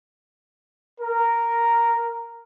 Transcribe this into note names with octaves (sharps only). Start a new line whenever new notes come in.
A#4